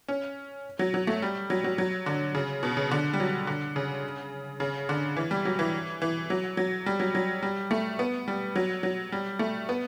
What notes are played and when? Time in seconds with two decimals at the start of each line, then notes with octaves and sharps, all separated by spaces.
0.08 C#4
0.79 F#3
0.94 F#3
1.07 A3
1.22 G3
1.50 F#3
1.64 F#3
1.78 F#3
2.06 D3
2.35 C#3
2.63 B2
2.77 C#3
2.91 D3
3.13 G3
3.20 F#3
3.47 D3
3.76 C#3
4.60 C#3
4.89 D3
5.17 E3
5.31 G3
5.45 F#3
5.59 E3
6.02 E3
6.30 F#3
6.57 F#3
6.86 G3
7.00 F#3
7.15 F#3
7.43 G3
7.71 A3
7.99 B3
8.28 G3
8.56 F#3
8.83 F#3
9.12 G3
9.39 A3
9.69 B3